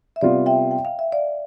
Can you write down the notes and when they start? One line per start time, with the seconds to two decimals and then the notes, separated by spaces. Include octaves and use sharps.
0.16 E5
0.21 C3 G3 B3 F4 D5 F5
0.46 E5 G5
0.71 G5
0.85 F5
0.99 E5
1.12 D5 F5